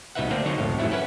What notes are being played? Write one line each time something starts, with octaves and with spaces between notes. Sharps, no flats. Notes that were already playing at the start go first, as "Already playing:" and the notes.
C2 B2 D#4 B4 E5 F#5
D3 A3 A#3 C4 D4
D3 F#3 D#4 C#5
C2 F2 A2
G#2 D#3 E3 F#3 A3 E4
C#4 E4 B4 F#5